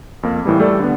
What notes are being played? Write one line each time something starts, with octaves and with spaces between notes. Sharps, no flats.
F2 A#3
A2 E3 G3
G3 A3 A4 D5
D3 B3